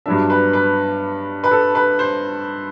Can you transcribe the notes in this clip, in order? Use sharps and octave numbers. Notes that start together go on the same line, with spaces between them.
G2 F#3 B3 D4 E5
B4
B4
B4
A4
B4
C5